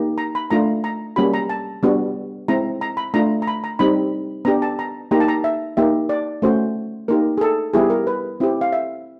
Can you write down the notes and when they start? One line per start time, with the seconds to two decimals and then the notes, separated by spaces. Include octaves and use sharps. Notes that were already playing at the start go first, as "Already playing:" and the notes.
Already playing: A#3 D#4 G4
0.18 A#5
0.35 B5
0.50 A3 D4 F4 A#5
0.84 A#5
1.16 G3 A#3 C#4 F#4 B5
1.34 A#5
1.50 A5
1.83 G3 B3 D4 F#4
2.48 G#3 C4 E4 A#5
2.81 A#5
2.97 B5
3.14 A3 D4 F4 A#5
3.42 A#5
3.47 B5
3.64 A#5
3.79 G3 C4 D#4 B5
4.45 B3 D4 G4 A#5
4.62 A5
4.79 A#5
5.11 A#3 D#4 G4 A#5
5.20 A5
5.28 A#5
5.44 E5
5.77 A#3 D#4 G4 E5
6.09 D5
6.42 A3 C#4 F#4 C5
7.08 A#3 D#4 G4 A#4
7.38 G#4
7.41 A4
7.74 G3 B3 E4 G4 G#4
7.90 A#4
8.07 B4
8.40 C4 E4 G4
8.61 F5
8.73 E5